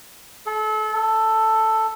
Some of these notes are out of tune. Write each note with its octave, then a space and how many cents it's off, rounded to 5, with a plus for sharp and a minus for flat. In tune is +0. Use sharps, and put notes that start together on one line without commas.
A4 -30
A4 +5